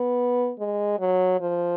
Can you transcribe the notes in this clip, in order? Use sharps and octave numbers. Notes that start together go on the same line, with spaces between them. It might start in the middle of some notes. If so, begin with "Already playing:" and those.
Already playing: B3
G#3
F#3
F3